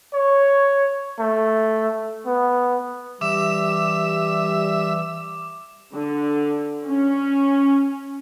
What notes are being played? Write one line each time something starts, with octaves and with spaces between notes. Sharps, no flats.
C#5
A3
B3
E3 G3 E5 D6 E7
D3
C#4